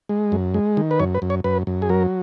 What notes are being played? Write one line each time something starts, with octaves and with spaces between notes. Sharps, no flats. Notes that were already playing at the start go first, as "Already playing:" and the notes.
G#3
F#2
G#3
D#3
B4
F#2 C#5
B4
F#2
C#5
F#2 B4
F#2
G#4
F#3 A#4